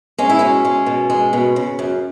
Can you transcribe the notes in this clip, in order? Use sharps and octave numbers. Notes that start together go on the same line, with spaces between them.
G#3 C#4
E4
B2 C#4
G#3
B2
G#3
B2
C#3
F#2